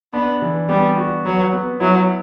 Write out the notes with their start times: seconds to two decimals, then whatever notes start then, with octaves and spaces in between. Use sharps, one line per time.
0.14 B3 D4
0.42 E3
0.69 G3 B3
0.97 F#4
1.25 F#3 B4
1.53 B3
1.80 F#3 E4